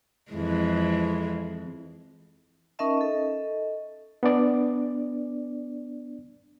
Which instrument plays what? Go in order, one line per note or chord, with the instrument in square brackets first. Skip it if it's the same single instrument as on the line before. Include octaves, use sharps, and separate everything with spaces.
[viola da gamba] F2 E3 G#3
[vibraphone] C#4 D#4 A#4 D#5 E5 A5
A4 D#5
[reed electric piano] B3 D4 D5